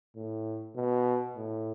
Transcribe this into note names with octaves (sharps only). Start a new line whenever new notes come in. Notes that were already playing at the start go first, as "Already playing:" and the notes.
A2
B2
A2